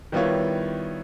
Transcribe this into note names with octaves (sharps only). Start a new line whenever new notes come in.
D#3 G3 B3 E4 F4 C#5